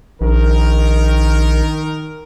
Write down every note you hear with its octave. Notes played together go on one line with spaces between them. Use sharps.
A#1 D#3 A#4